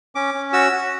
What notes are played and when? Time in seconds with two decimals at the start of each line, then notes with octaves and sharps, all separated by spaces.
0.15 C#4 D6
0.34 C#4
0.53 F#4 E6
0.72 F#4